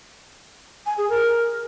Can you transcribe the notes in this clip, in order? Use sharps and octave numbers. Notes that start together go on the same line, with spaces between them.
G#5
G#4
A#4